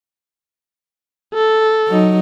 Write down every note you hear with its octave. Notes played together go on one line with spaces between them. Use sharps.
A4
F#3 D#4